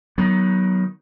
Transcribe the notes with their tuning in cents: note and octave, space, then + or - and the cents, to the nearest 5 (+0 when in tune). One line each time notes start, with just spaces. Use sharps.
D#3 +15 F#3 +20 B3 -5